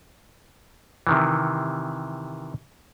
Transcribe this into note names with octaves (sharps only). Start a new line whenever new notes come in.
C3 D#3 E3